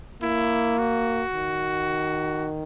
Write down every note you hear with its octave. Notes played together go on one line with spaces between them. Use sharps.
A#3 E4
F#4
D#3